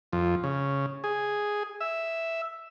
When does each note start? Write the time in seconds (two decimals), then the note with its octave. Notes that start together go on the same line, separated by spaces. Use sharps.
0.13 F2
0.44 C#3
1.04 G#4
1.80 E5